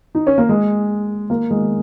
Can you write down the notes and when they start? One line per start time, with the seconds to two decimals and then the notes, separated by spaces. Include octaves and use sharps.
0.15 D#4
0.27 C#4
0.38 A#3
0.49 G#3
1.30 A#3
1.51 G#3